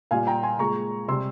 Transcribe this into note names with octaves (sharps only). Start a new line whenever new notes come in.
A#2 G3 F5 G#5
G5 A#5
G#5 C6
A#2 G#3 A#5 C#6
C3 G3 C6 E6